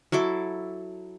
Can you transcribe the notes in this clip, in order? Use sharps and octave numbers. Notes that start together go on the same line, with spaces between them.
F#3 E4 A4 D6